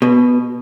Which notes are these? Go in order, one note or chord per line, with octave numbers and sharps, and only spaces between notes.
B2